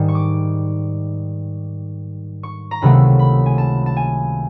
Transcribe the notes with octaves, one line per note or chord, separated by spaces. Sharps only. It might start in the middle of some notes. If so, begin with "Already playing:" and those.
Already playing: G#2 D#3 G3
C#6
D6
C#6
A#5
C#2 C3 D#3 F#3 A3 B5
B5
G#5
A5
A5
G#5